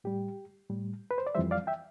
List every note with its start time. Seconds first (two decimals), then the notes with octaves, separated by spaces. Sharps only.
0.04 A2 G3 G4
0.69 A2 G3
1.11 B4
1.18 C5
1.27 D5
1.35 F2 E3 G3 C5 E5
1.51 D5 F5
1.67 E5 G5